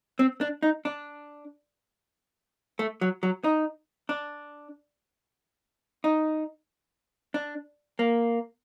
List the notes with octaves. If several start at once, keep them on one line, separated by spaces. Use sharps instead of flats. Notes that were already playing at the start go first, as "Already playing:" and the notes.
C4
D4
D#4
D4
A3
F#3
F#3
D#4
D4
D#4
D4
A#3